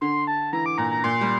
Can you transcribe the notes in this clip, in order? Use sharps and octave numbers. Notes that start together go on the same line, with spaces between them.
D3 C6
A5
E3 A#5
D6
A#2 A#5
A#5
A#2 C6
G3